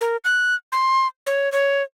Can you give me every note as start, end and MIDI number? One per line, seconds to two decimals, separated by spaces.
0.01 0.17 70
0.24 0.55 90
0.72 1.07 84
1.27 1.51 73
1.52 1.82 73